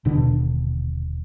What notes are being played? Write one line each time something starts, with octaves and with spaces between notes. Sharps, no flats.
D#1 B2 D3 D4